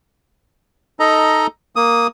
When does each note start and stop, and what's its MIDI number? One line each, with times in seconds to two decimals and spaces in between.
1.00 1.47 63
1.00 1.47 69
1.00 1.47 75
1.00 1.47 82
1.76 2.07 58
1.76 2.07 87